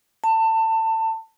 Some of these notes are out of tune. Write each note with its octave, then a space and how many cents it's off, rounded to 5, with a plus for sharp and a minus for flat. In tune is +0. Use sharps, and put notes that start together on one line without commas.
A5 +25